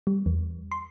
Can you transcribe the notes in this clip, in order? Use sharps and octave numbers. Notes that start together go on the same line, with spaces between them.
G3
E2
C6